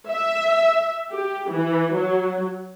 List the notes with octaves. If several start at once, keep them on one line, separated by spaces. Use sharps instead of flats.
E5
G4
E3
F#3